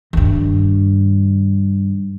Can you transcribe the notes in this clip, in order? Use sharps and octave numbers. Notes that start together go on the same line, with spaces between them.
G2 D#3